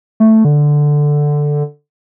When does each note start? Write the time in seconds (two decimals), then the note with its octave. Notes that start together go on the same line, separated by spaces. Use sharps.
0.20 A3
0.45 D3